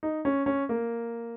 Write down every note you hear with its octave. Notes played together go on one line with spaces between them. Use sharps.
D#4
C#4
C#4
A#3